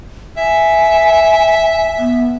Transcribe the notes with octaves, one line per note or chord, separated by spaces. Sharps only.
E5 G#5
B3